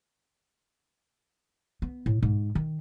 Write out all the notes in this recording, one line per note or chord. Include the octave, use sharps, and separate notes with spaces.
B3
A2
G#2
D#3